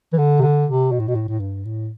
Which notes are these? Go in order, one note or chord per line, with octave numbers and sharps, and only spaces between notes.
E3
D3
C3
D3
C3
B2
A2
B2
A2
A2
G2
A2